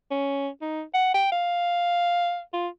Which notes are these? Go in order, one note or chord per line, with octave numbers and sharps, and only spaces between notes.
C#4
D#4
F#5
G5
F5
F4